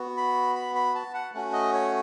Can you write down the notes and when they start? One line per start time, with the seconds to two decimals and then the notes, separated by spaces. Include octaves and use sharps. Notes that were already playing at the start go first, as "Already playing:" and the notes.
Already playing: B3 F#4
0.17 B5
0.55 B5
0.75 B5
0.95 A5
1.14 F#5
1.34 A3 C#4 F#4 F#5
1.53 D#5
1.73 C#5